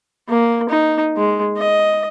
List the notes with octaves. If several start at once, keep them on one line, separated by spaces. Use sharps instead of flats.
A#3
D#4
G#3
D#5